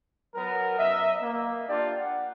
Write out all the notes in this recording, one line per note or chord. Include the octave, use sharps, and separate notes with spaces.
F#3 B3 A#4
F#2 D#5 E5
A#3
D4 F4 G4 D5
F#5